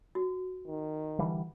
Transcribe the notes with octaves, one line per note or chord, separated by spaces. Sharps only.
F#4
D#3
D3 E3 G3